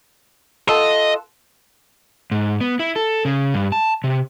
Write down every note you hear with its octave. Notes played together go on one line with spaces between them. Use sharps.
F4 A4 D#5 F#5
G#2
B3
E4
A4
C#3
G2
A5
C3